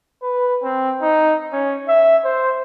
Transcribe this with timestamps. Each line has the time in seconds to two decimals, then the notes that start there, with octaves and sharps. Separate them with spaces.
0.23 B4
0.63 C4
1.02 D#4
1.52 C#4
1.89 E5
2.24 C5